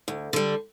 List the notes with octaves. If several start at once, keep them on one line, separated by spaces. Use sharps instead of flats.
D2
D3 G3